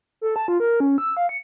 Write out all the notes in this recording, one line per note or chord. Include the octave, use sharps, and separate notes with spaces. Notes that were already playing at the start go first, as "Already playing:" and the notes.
A4
A5
F4
A#4
C#4
E6
F5
C#7